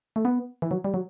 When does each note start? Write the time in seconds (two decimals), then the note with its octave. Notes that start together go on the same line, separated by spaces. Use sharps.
0.16 A3
0.25 B3
0.62 E3
0.71 F#3
0.84 G3
0.94 F#3